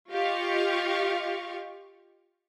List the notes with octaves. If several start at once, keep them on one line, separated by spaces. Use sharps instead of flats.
F4 G4 D#5 F5 C#6